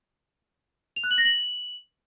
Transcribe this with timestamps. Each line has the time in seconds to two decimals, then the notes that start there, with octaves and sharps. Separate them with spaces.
0.96 F7
1.04 F#6
1.11 F#7
1.18 A#6
1.25 F#7